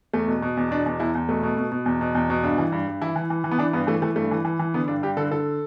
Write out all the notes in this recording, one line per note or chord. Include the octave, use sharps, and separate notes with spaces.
E2 A3
B2
B2
E2
B2 D4
E2
E2 E4
E2
B2 A3
B2
B2
B2
E2
B2
E2
B2
G2 D4
E3
G2
G2
E3 E4
E3
E3
E3
B3
E3 D4
G2 B3
E3 A3
E3 A3
G2 A3
E3
E3
E3
D3 B3
G2 D4
G2 G4
D3 A4
D3 A4